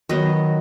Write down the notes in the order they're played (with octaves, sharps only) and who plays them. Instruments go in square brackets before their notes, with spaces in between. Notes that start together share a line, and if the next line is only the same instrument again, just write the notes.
[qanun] D#3 F#3 B3 D#5